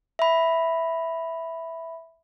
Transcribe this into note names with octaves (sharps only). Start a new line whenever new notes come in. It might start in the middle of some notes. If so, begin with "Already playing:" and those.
E5 B5